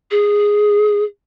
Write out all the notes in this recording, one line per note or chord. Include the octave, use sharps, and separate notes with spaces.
G#4